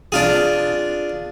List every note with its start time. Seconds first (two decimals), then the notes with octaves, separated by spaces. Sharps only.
0.12 D4 F4 G#4